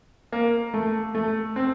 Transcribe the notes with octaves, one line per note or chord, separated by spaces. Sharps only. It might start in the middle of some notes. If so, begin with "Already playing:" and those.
A#3
A3
A3
C4